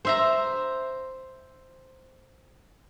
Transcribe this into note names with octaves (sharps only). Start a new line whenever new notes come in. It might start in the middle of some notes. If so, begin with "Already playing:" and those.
C5 E5 A#5